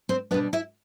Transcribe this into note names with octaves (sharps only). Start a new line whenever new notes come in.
C4 C5
B2 G3 B3 D4 B4
E4 E5